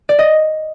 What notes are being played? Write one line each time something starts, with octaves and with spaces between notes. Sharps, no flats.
D5
D#5